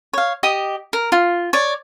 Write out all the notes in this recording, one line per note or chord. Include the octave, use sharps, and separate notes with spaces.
C#5 F5
G4 D#5 D#6
A#4
F4
C#5 D5